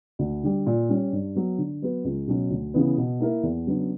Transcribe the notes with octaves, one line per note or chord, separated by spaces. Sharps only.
D2
D3 G3
A#2
G3 C#4
G2
F#3 B3
D3
F#3 B3 F#4 B4
C#2
B2 F#3 C#4
D2
C#3 E3 B3
B2
A#3 E4 A#4
E2
C#3 F#3 B3 D4